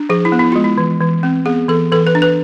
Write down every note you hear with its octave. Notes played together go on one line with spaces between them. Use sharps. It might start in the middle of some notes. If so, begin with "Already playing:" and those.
Already playing: D4
F3 G#4
E4
B3
E4
G#3 F4
E4
E3
E3
C4
B3 G#4
E3 A4
E3 A4
B4
D4
B4